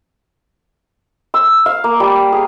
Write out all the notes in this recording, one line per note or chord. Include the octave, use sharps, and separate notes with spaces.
E6
F5
A#3
G3
G#4